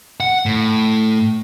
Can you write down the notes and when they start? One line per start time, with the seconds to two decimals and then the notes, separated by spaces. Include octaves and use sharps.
0.20 F#5
0.46 A2